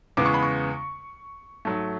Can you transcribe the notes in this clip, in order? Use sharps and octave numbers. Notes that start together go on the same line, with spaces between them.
E2 C#3 G#3 B3 D6
C#6
B5
C#6
G#2 F#3 A3